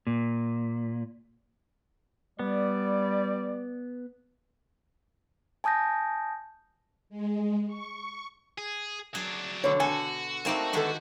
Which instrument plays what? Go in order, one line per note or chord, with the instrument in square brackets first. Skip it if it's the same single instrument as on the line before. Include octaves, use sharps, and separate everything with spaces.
[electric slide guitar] A#2
[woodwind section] G3 [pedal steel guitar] B3 [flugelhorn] D5
[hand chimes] G#5 A5 D#6 G6 A#6
[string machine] G#3
C#6
[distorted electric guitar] G#4
[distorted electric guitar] F#3 D4 [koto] G#4
[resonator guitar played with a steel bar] B2 D3 [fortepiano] C#5
[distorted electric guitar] F#4 [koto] A4 [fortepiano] G#5
[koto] A3 D5 A5 [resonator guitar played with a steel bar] A#3 C4 D#4
[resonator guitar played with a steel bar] D3 B3 A4 [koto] D#3 G#3 G4